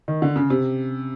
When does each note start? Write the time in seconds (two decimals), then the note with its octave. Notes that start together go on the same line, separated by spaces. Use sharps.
0.08 D#3
0.22 D3
0.36 C#3
0.50 C3